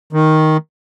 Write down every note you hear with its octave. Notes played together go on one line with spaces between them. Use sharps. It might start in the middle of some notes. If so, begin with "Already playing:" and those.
D#3